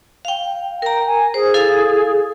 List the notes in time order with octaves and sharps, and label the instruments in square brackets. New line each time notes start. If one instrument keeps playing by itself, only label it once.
[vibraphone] F5 G5
[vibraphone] A#4 A#5 [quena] G5
[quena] G#5
[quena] G#4 [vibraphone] C5
[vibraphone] E4 A4 F5